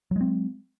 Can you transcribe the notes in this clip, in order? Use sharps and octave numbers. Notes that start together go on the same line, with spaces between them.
F#3 G#3 C4